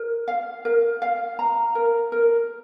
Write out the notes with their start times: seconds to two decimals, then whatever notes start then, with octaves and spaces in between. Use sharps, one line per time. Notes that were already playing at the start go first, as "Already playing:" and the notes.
Already playing: A#4
0.28 F5
0.65 A#4
1.02 F5
1.39 A#5
1.75 A#4
2.12 A#4